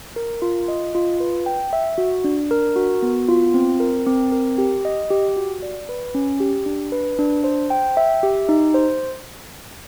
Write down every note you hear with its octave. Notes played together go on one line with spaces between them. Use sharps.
A#4
F4
D#5
F4
B4
G5
E5
F#4
D4
A#4
F#4
B3
F4
C4
A#4
C4
A#4
G4
D#5
G4
F#4
D5
B4
C#4
G4
D4
B4
D4
C5
G5
E5
G4
D#4
C5